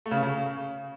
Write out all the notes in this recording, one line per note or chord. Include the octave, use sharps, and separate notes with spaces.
A3
C#3
C#4
C#3